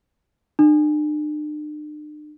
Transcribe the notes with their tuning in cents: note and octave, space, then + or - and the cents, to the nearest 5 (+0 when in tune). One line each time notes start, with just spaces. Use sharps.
D4 +45